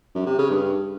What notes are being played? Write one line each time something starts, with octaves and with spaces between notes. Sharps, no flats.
F#2
C3
C#3
G2